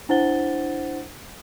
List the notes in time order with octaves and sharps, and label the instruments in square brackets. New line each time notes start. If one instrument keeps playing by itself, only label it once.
[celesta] D4 E4 C5 F#5 A6 G7